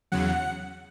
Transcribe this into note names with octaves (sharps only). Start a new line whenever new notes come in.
E2 C#3 F#3 F#5